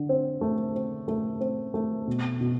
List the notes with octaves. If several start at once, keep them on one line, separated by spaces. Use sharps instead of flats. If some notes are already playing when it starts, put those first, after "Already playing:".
Already playing: D3
C4
A3
C4
A3
C4
A3
B2
B2